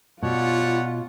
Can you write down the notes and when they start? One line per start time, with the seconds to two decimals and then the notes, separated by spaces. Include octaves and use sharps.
0.22 B2 G3 F4 C#5 F#5